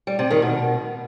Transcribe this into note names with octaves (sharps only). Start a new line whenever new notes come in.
G3
C3
D#3
B2